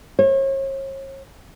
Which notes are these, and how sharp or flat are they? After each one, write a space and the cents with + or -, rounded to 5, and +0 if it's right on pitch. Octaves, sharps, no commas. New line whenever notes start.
C#5 -40